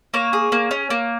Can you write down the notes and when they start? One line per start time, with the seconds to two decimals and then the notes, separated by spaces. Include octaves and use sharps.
0.14 A#3 C#5
0.33 G#4
0.52 A#3
0.71 C#4
0.90 A#3